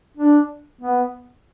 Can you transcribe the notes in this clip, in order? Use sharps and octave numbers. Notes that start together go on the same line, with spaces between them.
D4
B3